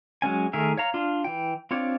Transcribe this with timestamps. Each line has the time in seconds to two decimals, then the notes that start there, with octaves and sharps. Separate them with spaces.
0.22 F#3 G#3 C#4 G#5
0.53 D#3 A3 G#4 A#4 E5
0.77 C#5 F5 A#5
0.94 D4 F4
1.24 E3 G5
1.71 C4 D4 F4 C#5 D5